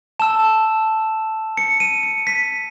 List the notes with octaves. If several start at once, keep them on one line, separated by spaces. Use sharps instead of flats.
A5 E6 E7
C#7
D#7
C#7
B6